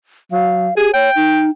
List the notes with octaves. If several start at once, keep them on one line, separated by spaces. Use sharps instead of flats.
F#3 F5
G4 G#4
C#5 G5
D#4